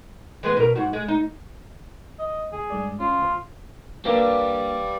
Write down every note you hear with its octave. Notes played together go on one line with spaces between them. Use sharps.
E3 G#3 B3
B2 A#4
G#2 F#4
G#3
D#4
D#5
D2 G#4
G2 G#3 D5
C#4 F4
D2 C5
G3 A#3 D4 B4 F5